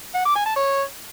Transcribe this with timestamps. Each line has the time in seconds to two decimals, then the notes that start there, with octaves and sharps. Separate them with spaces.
0.15 F#5
0.25 D6
0.35 G#5
0.46 A5
0.56 C#5